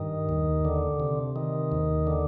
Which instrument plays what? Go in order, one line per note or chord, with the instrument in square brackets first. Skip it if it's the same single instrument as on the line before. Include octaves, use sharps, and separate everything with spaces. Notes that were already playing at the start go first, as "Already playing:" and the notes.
Already playing: [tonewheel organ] G2 D#3
D#2
D3
C3
D#3
D#2
D3